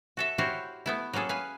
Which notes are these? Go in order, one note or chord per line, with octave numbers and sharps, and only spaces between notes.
F#4 A4 E5
E4 F#4 G4 C5 C#5 F5
A3 B3 E4
F#3 A#3 C#4 G#4 A4
B4 F5 G#5